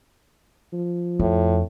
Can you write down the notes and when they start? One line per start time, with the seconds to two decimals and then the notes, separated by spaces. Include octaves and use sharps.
0.73 F3
1.19 F2 A2